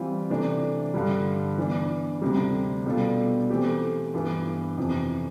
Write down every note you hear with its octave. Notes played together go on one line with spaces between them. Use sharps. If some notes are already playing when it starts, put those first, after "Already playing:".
Already playing: E3 G3 C4 F4
C3 E3 A3 D4
G2 D3 G3
E3 B3 D4
D2 C3 G3
B2 G3 D4 F4 A4
E3 A3 C4 G4
G2 E3 B3
F2 C3 E3